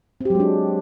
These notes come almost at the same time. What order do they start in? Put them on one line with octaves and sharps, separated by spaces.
C4 G4 F#3 G#3 D4